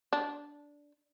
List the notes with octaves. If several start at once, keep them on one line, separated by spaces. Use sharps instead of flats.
D4